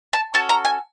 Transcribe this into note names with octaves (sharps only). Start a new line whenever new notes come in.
A5
C#4 F#4 A4 A5
A#5
G#5